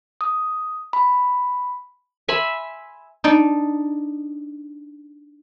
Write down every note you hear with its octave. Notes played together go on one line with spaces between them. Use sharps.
D#6
B5
E5 G#5 B5 C6
D4 D#4 D5